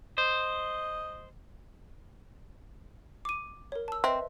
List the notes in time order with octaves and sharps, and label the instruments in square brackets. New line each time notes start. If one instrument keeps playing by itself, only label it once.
[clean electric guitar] C5 [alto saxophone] D#5
[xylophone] D6 D#7
A#4 C#5
A5 E6
[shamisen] C4 [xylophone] B4 D#5 E5